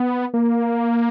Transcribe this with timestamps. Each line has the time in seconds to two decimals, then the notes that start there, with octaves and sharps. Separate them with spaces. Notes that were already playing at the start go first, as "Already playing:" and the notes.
Already playing: B3
0.34 A#3